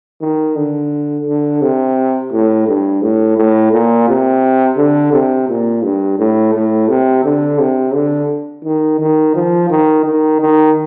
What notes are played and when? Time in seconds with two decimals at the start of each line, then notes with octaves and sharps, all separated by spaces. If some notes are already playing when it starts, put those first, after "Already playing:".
0.21 D#3
0.56 D3
1.27 D3
1.62 C3
2.33 A2
2.67 G2
3.02 A2
3.37 A2
3.73 A#2
4.08 C3
4.78 D3
5.13 C3
5.49 A#2
5.83 G2
6.19 A2
6.54 A2
6.89 C3
7.24 D3
7.59 C3
7.94 D3
8.65 D#3
9.00 D#3
9.35 F3
9.70 D#3
10.05 D#3
10.41 D#3